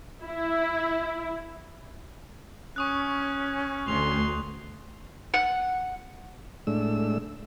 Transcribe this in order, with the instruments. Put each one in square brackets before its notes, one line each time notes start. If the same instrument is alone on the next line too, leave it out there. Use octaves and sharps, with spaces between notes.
[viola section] E4
[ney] C#4 [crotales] C#6 D#6 F#6
[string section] D2 [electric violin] C6 [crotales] F7
[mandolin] F#5
[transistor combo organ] A2 G#3 A3 D4 E6